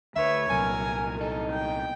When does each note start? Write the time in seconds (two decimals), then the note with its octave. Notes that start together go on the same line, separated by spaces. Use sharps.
0.16 D2 B4 C#5 E5
0.50 C2 A#2 F#3 A#4 G#5
1.20 D#4 A4
1.51 G5